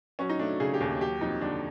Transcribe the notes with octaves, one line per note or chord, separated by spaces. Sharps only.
F#3 C#4
D#4
A3 D4
C#3 G#4
G4
D#2 G#4
F#3 G4
F2 D#4
D3 D4